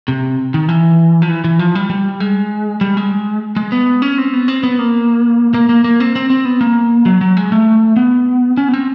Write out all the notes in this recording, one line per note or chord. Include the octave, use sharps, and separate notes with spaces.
C3
D#3
E3
F3
E3
E3
F3
G3
G3
G#3
G3
G#3
G#3
B3
C#4
C4
B3
C4
B3
A#3
A#3
A#3
A#3
C4
C4
C4
B3
A#3
F#3
F#3
G#3
A3
B3
C#4
B3
C4